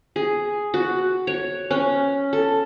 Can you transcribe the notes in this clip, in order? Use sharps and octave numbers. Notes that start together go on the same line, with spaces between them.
G#4
F#4
C#5
C#4
A4